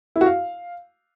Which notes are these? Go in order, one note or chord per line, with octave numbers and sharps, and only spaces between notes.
E4
F#4
F5